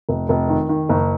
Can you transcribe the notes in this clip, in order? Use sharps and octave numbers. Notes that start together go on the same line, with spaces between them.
F1
F1
D#3
D#3
F#1